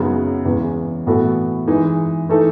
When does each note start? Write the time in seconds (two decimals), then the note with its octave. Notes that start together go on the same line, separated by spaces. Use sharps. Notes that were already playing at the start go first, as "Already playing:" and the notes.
Already playing: F#2 C#3 G#3 B3 D#4
0.45 E2 C#3 E3 G#3
1.06 A2 E3 B3 F#4 A4
1.67 E3 G#3 D#4
2.29 E3 A3 D#4 A4